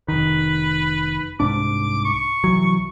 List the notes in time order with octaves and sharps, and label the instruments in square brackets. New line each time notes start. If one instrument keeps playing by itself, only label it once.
[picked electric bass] F1 D#3 [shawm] B4
[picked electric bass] C2 G#2 D4 [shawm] D6
[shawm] C#6
[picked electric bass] C2 E3 F#3